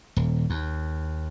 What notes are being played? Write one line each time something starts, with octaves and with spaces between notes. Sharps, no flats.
D#1
D#2